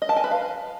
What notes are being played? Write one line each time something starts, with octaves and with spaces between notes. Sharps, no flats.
D#5
A5
G#5
B4
F5